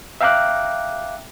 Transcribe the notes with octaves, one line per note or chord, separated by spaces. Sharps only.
E5 F5 G5 A#5 D6 F#6